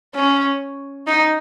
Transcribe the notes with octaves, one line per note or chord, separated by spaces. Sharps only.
C#4
D#4